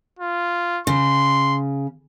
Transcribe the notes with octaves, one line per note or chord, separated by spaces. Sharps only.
F4
C#3 C6